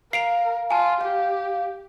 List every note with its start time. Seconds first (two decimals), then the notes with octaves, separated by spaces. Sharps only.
0.13 A#4 F5 C7 D7 F7
0.71 F4 G#5 A5
1.01 G4 F5